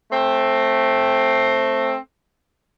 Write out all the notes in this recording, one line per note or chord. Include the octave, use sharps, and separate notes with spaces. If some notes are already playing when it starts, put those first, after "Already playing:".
A3 C4